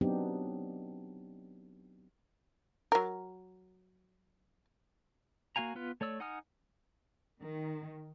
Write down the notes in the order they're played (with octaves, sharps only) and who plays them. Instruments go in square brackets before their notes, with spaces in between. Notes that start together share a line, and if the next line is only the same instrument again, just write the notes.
[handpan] F#3 B3 C4 D4 D#4 G4
[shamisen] F#3 A#4
[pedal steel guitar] A#3 F#4 F5 G#5 A#5
B3 F4 B4
A3 C#5 D5 E6
D#4 F#5 G#5 D#6 F6
[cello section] D#3